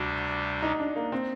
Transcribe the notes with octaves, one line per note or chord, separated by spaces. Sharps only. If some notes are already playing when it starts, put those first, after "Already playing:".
Already playing: D2 C3 G3 D4 F#4
D#4
D4
A#3
C4